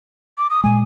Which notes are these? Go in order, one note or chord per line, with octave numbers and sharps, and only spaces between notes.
D6
D#6
A#2 G#3 G#5